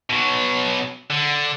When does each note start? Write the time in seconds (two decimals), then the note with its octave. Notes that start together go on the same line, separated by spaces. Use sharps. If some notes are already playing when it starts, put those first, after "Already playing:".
0.10 B2 F#3
1.10 D3